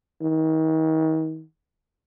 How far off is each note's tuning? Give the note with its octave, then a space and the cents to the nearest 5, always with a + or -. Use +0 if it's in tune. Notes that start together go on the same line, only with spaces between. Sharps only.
D#3 +35